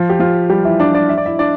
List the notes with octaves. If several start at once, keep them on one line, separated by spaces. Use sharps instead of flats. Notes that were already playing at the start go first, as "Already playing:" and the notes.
Already playing: F3 F4
G4
F3 F4
G3 G4
E3 E4
D4 D5
D4 D5
E5
D5
E4 E5
D4 D5